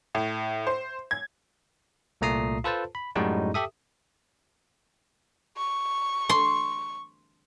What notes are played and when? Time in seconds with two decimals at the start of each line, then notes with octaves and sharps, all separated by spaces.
0.15 A2
0.67 C5
1.11 G#6
2.21 C2 A#2 A3 A#5 D#6 C7
2.64 F4 A4 B4 C5 A5
2.95 B5
3.15 F#2 A2 G3 G#3 D#4 F#4
3.54 G4 A4 E5 D#6
5.57 C#6
6.29 C6